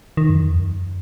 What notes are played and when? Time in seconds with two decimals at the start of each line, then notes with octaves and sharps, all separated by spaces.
0.17 D#3
0.30 F#2
0.42 E2
0.54 F#2